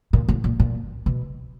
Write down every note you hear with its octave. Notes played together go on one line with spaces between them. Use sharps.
A#2
A2
A#2
A#2
B2